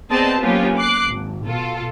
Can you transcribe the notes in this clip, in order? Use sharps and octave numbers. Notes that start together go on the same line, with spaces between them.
B3 C4 G#4 D5 D#5 A5
F#3 A#3 B3 C#4 F4 G4
D6 F#6 C7
G#1
B2 F4 A4